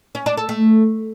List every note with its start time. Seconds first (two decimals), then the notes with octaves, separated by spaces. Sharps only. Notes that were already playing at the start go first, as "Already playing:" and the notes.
0.15 C#4
0.26 D4
0.37 A4
0.49 A3